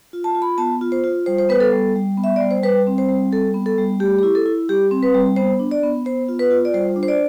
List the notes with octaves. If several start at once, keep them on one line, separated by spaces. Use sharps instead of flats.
F4
A5
F4
B5
B3 A5
F4
C5
F4
G3 C5
C5
B3 B4
A4
G3
G3
B3
E5
G3 D5
C5
G3 B4
C4
C5
G3
G3 A4
B3
A4
G3
A3 G4
G4
E4
A4
E4
G3 G4
C4
B4
G3
B3 C5
D4
D5
B3
B3 C5
F4
B4
F4
D5
G3 C5
D4
C5
D5